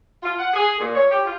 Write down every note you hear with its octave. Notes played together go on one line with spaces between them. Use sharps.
F4
F#5
G#4
A#2
C#5
G4
F4